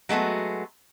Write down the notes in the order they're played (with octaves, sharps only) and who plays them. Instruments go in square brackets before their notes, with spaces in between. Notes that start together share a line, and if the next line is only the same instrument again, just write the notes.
[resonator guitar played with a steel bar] F#3 G#3 A3 B3 F#4